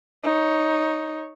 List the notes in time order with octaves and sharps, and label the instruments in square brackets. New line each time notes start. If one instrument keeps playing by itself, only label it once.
[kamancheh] D#4 C#5